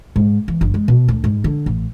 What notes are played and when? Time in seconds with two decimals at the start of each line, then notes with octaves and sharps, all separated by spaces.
0.16 G#2
0.48 E3
0.61 G1
0.74 G#3
0.88 B2
1.08 D2
1.24 G#2
1.44 D3
1.66 A1